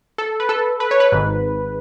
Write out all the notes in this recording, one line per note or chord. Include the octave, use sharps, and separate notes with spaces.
A4
B4
A4
B4
C#5
B4
G#1 G#2